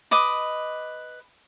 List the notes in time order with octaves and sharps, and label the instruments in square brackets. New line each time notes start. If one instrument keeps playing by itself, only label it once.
[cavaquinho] B4 D#5 D6